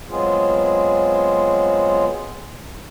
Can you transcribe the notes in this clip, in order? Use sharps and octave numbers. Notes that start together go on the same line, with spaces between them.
F#3 G#3 B3 C4 F4 G#4